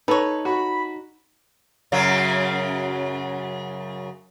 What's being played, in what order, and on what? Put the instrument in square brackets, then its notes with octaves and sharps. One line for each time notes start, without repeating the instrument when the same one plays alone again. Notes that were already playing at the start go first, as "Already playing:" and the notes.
[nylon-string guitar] D#4 [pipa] A4 C#5 [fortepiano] B4
[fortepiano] F#4 [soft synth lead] B5
[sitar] F#2 C#3 F#3